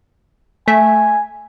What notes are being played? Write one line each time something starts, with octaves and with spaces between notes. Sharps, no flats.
A3 E5 G#5